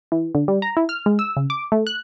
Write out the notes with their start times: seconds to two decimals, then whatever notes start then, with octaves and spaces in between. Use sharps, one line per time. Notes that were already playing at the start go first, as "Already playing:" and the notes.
0.12 E3
0.35 D3
0.48 G3
0.62 A#5
0.77 E4
0.89 F6
1.06 G#3
1.19 E6
1.37 C#3
1.50 D6
1.72 A3
1.87 F#6